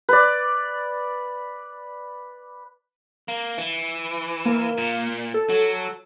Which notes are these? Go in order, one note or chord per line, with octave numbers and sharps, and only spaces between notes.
B4 D5
A#3
E3
A#3
A#2
A4
F#3